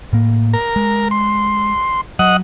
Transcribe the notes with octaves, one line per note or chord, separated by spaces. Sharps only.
A2 A#3
A#4
G#3
C6
F#3 D#5 F#5